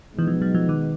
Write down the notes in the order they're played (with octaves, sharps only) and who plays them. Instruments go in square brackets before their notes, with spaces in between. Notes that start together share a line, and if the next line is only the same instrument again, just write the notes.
[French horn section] B2 G#3 B3 D#4 [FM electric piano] E3
[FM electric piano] F3
F#3
F3
D#3